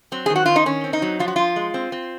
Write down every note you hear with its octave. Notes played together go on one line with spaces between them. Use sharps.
F#3 C4
D#3 G#4
F#4
D#3 F4
D#4
D#3 C#4
C4
D#4
F#3
F3 F4
F#4
F3 F4
G#3
C4
C4